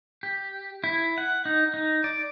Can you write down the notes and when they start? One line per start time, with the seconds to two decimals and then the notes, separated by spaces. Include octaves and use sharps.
0.23 G4
0.84 E4
1.18 F#5
1.45 D#4
1.74 D#4
2.04 D5